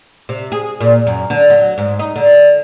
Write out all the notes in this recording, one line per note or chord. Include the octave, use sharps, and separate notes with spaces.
C3
G#4
A#2
F#2
D3
F#3
G#2
D#4
D3